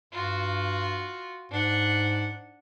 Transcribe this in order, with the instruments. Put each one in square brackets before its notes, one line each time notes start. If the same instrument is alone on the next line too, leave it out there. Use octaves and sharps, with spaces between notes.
[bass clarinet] G2 [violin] F4 F#4
[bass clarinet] G#2 [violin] D4 F#5